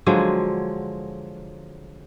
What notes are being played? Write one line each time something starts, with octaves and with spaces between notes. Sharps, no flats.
D3 F3 F#3 G#3